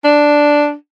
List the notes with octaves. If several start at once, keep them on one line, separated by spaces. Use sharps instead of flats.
D4